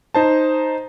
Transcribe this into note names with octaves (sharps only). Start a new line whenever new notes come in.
D#4 C5 A5